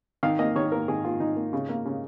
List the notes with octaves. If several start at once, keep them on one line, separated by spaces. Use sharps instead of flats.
D#3 F5
A#3 D#5
D#3 C#5
A#3 A#4
D#3 G#4
A#3 F4
D#3 D#4
A#3
C#3
A#3
C#3